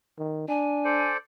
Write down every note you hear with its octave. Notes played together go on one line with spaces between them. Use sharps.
D#3
D4 G#5
A4 C5 D5